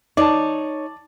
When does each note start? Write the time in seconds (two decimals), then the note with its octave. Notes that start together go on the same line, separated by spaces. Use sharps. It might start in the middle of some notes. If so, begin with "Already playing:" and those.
0.17 D#4 C#5 D5 A5